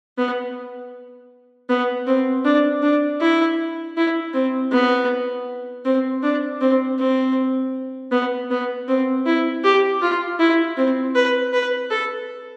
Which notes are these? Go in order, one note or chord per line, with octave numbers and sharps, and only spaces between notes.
B3
B3
C4
D4
D4
E4
E4
C4
B3
C4
D4
C4
C4
B3
B3
C4
E4
G4
F4
E4
C4
B4
B4
A4